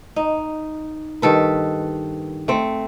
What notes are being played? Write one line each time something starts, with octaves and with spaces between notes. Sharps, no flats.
D#4
G2 D#3 A4 B4
A3 C4